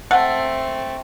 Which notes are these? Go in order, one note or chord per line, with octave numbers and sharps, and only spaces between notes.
A3 C4 F#5